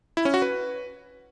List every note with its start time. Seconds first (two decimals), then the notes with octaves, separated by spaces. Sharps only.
0.17 E4
0.25 C#4
0.34 F#4
0.42 B4